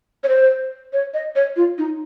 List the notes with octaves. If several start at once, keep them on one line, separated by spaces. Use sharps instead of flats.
C#5
C5
C#5
D#5
C#5
F4
D#4